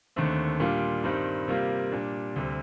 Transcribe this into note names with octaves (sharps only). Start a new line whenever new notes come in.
D#2 D3 A3 C4
A#2 G3 D4 F4
G2 D#3 G3 C4
C3 G3 A#3 F4
A#2 G3 D4
D2 C3 G3